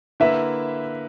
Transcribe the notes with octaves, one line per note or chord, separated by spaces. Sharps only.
D3 A#3 E4 B4 E5